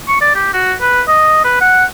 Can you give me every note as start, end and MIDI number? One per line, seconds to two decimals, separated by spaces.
0.08 0.18 85
0.21 0.33 74
0.35 0.51 67
0.54 0.74 66
0.81 1.02 71
1.08 1.40 75
1.44 1.58 71
1.61 1.85 78